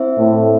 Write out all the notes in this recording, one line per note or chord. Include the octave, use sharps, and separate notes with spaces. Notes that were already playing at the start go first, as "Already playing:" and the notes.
Already playing: C4 E4 C5 E5
A2